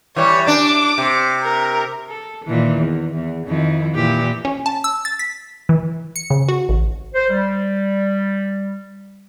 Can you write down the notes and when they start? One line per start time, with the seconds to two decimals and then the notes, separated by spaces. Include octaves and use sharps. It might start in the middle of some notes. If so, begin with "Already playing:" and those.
0.16 E3 G3 C#5
0.47 D4 D6
0.98 C3
1.43 A#4
2.09 A4
2.45 A#2 D#3 E3
2.77 E2
3.15 E2
3.47 F2 D#3 E4
3.95 A#2 E3 G4
4.45 C#4
4.66 A5
4.84 E6
5.05 A6
5.19 B6
5.69 E3
6.16 C#7
6.30 C#3
6.49 F#4
6.69 A1
7.14 C5
7.30 G3